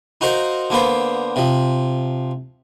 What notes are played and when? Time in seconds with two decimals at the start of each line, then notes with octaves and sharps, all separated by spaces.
0.21 D#4 F#4 A#4 C5 F5
0.70 D3 A#3 B3 C5
1.36 C3 F3